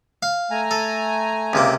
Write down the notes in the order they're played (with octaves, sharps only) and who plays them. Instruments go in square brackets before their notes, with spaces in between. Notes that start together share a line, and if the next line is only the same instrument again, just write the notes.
[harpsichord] F5
[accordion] A3 G#5 A#5
[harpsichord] A4
C#2 C3 A#3